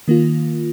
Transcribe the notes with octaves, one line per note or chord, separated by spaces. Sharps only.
D#3 A#3 F4